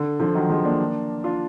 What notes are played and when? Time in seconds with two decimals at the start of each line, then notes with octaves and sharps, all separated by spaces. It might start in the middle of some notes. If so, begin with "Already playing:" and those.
Already playing: D3
0.20 D3 F3
0.34 D#3 F#3
0.50 F3 G#3
0.65 A#3 D4
1.24 D4 F4